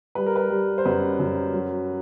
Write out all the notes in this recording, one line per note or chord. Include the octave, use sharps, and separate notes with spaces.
G3 B4
A#4
B4
G3
C5
F#2 B4
F#2
F#3